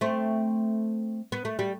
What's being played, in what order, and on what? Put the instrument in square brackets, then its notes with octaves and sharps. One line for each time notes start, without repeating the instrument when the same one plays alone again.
[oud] A3 C4
B3
A3
G3